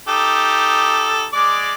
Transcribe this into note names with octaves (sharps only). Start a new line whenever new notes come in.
D#4 G4 A4
G#3 D5 D6